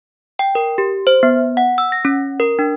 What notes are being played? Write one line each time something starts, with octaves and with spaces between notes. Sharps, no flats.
G5
A#4
G4
C5
B3
F#5
E6
A#6
C#4
A#4
D4